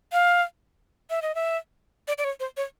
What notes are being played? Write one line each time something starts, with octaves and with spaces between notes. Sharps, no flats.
F5
E5
D#5
E5
D5
D5
C#5
C5
C#5